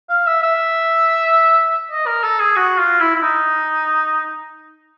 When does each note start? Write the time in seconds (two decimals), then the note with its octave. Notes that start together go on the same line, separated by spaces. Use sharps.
0.09 F5
0.26 E5
0.42 E5
1.91 D#5
2.07 A#4
2.23 A4
2.39 G#4
2.56 F#4
2.78 F4
3.01 E4
3.15 E4
3.22 D#4